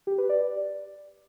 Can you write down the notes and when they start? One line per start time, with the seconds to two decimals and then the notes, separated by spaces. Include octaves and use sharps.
0.07 G4
0.18 B4
0.29 D5